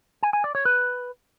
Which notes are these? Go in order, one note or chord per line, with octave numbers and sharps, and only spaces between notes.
G#5
G#5
D5
C#5
B4